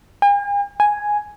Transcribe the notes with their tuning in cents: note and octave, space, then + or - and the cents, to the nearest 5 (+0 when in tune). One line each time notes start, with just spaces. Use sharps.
G#5 -45
G#5 +0